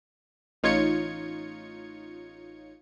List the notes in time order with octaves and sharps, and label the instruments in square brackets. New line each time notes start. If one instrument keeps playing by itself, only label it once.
[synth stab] A1 D#4 F4 C#5 G#6 C#7